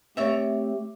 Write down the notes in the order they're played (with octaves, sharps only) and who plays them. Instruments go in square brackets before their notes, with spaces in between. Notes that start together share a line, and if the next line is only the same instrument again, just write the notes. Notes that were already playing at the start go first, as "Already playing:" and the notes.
[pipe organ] A3 C4 G4 [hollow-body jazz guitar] C#5 D5 E5